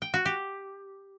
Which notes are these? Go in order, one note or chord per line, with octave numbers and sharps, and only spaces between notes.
G5
F#4
G4